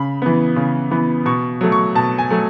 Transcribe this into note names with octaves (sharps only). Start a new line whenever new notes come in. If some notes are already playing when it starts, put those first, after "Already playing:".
Already playing: C#3 B5
E3 B3
C#3
E3 B3
B2 C#6
F#3 A3
C#6
B2 A5
G#5
F#3 A3